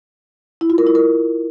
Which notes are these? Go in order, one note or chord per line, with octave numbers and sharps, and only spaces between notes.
E4
F4
A#4
E4
A#4